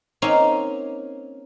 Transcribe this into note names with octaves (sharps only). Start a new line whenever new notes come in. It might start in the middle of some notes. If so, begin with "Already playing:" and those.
A#3 C4 C#4 D#4 F5